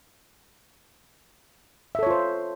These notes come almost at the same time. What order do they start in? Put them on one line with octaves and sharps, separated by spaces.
E5 A4 C#5 F4 C5